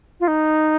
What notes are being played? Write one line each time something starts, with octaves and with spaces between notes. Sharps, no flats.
F4
D#4